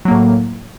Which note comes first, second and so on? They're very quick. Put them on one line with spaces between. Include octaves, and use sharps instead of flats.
F#3 A#3 A2